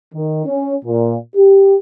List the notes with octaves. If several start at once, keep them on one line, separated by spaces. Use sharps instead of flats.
D#3
C#4
A#2
G4